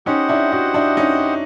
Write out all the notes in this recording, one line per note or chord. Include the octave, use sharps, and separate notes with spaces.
C#4 D#4 G4 C5 D#5 F#5
D4 E4
E4 F#4
D4 E4
C#4 D#4